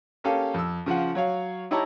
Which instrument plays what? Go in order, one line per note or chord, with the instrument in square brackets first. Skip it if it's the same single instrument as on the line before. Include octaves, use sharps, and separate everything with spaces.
[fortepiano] A#3 C#4 G4 A4 F5
F2 E6
C#3 F3 F4 F#5
F#3 C#5 F5
D#4 E4 G4 C#5 A5 A#5